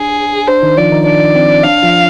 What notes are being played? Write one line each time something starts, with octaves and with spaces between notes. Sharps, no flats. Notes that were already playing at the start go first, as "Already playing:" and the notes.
Already playing: D4 G#4
D4 C5
D#3 D#4
F3 F4 D5
D#3 D#4
D4 D5
C4
D4 F5
F3 F4